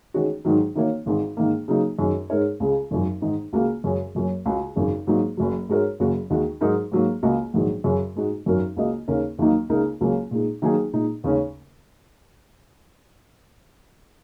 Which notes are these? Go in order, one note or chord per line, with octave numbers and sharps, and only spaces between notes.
D#3 G#3 C#4 F#4
G#2 D#3 F#3
D#3 A#3 F#4 C#5
G#1 G#2 D#3
G#2 D#3 A#3
C#3 F#3 A#3 D#4
F#2 D#3 G#3 C#4
G#2 G#3 D#4 A#4 C#5
C#2 C#3 G#3
G#1 F#2 F#3
G#2 D#3 G#3 D#4
C#2 C#3 A#3 F#4
F#2 C#3 G#3 C#4 G#4
F#1 F#2 F#3 C#4
C#2 C#3 G#3 F#4
G#1 F#2 C#3
G#2 F#3 A#3 D#4
F#1 F#2 F#3
G#2 G#3 F#4 A#4 C#5
F#1 F#2 C#3 A#3 F#4
D#2 D#3 G#3 F#4
G#2 F#3 D#4 A#4
G#2 F#3 A#3
C#2 C#3 A#3 F#4 D#5
A#1 G#2 D#3 F#3
F#2 C#3 F#3 C#4
G#2 G#3 D#4 F#4
G#1 F#2 F#3 C#4 A#4
C#2 C#3 A#3 F#4 D#5
D#2 C#3 A#3 C#4 A#4
D#2 D#3 F#3 A#3 D#4
C#2 C#3 A#3 D#4 A#4
C#2 C#3 F#3 A#3 C#4
A#2 G#3 D#4
D#3 F#3 A#3 D#4 G#4
A#2 G#3 D#4
D#2 C#3 G#3 C#4